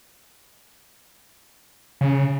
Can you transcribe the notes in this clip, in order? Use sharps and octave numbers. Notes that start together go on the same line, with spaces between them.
C#3